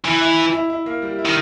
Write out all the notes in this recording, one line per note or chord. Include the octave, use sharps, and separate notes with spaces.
E3 E4
E4
E4
E4
E4
A#3
G3
E4
D#3